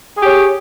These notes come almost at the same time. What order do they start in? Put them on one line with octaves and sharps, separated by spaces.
G#4 G4 C#5